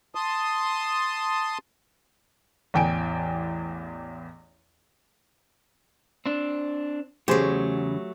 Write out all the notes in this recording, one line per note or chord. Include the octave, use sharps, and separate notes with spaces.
A5 C6 D#6
A1 E2 G5 G#5 D7
C4 D4
E2 C#3 F#3 A3 G4 G#4 C5